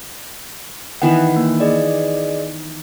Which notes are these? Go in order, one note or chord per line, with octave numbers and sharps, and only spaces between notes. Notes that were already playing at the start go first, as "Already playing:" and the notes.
D#3 E3 B3 F#5 G5
A#3
G#4 D5 D#5